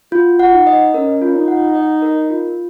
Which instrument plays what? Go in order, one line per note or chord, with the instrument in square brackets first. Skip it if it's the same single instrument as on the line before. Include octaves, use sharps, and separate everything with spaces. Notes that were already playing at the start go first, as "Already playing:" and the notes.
[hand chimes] F4 [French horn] F#4
[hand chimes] F#5
[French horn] D#4
[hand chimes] D#5
[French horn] C#4 [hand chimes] A#4
[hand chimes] F4
[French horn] D#4
[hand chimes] F#5
D#5
A#4
F4